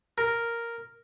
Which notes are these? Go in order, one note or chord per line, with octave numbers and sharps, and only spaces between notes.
A#4